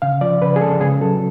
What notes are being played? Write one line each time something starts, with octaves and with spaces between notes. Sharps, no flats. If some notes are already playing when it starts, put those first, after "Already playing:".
C#3 F5
F3 D5
C#3 B4
G#4
G#3 A4
C#3 G#4
F#3 A4